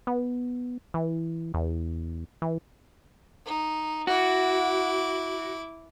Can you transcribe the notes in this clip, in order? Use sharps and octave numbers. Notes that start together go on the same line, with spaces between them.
B3
E3
E2
E3
D#4
E4 F#4 D6